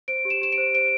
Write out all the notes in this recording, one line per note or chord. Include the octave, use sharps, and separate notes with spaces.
C5 D7
G4
E7
G4 E7
D7
C5
C5 D7